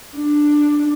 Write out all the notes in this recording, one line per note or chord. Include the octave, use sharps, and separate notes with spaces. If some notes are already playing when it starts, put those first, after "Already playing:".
D4